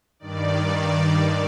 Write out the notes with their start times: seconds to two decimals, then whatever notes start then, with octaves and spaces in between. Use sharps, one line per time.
0.19 G2 D#3 D5